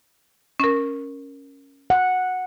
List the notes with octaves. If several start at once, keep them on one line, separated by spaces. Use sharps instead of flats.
C#4 A#4
F#5